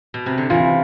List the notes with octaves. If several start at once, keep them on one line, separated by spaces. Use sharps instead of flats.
B2
C3
D3
C3 E3 F4